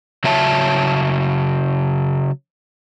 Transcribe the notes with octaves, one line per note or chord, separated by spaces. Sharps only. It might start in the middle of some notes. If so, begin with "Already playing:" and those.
C#3 F#3 C#5 E5 A5